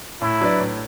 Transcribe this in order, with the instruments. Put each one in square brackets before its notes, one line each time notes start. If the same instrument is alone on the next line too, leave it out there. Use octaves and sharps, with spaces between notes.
[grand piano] A2 [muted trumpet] E4
[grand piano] F#3 D4 B4 D5
A2